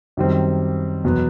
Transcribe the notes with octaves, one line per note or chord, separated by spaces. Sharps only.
F#2 D#3 G3 C4
E2 B2 F#3 B3